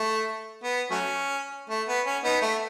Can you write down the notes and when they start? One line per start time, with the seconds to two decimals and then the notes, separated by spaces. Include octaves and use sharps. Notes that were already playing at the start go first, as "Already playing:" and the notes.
Already playing: A3
0.63 B3
0.90 F#3 A3 C#4
1.70 A3
1.88 B3
2.06 C#4
2.24 B3 D#4
2.42 A3